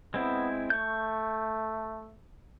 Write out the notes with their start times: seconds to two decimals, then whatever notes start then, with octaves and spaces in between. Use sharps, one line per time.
0.14 G#3 B3 C4 E4
0.70 A3 C#6 G6